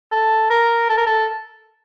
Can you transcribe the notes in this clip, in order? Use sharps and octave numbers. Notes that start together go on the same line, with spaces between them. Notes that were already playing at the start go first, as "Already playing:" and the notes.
A4
A#4
A4
A#4
A4